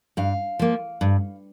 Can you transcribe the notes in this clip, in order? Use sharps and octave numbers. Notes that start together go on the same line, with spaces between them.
G2 F5
F3 A#3
G2